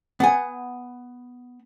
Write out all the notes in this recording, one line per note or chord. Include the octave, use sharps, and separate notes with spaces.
B3 F#5 G#5